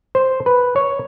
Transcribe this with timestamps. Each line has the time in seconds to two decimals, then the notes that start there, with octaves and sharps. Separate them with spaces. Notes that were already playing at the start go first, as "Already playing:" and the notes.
0.15 C5
0.46 B4
0.76 C#5